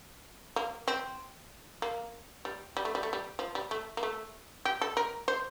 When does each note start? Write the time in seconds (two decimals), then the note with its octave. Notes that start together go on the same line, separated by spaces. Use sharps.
0.56 A#3
0.88 C4
1.82 A#3
2.45 G3
2.77 G3
2.85 A3
2.95 G3
3.03 A3
3.13 G3
3.39 F3
3.55 G3
3.71 A3
3.97 A#3
4.03 A3
4.65 G4
4.81 A4
4.97 A#4
5.28 C5